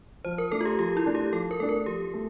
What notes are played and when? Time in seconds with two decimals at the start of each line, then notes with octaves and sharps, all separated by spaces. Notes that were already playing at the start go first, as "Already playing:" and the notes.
0.25 F3 C5
0.38 A#4
0.51 A3 D4 A4
0.61 F4
0.65 G4
0.79 F3 G4
0.97 E4
1.05 A3 D4
1.15 G4
1.32 F3 A4
1.51 A#4
1.59 A3 D4 A4
1.69 A#4
1.86 F3 G4
2.14 A3